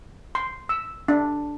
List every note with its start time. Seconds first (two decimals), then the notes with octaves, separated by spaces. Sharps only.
0.35 C6
0.69 E6
1.08 D4